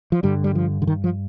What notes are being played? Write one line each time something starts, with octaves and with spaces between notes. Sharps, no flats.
F3
G2 D3 G3
G3
F3
D3
D#3
F3